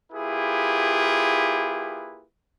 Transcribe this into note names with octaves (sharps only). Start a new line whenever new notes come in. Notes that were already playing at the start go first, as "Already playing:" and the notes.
A#3 E4 F4 G4 G#4 B4